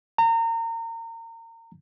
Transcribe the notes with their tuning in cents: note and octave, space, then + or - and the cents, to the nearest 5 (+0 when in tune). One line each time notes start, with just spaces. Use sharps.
A#5 -30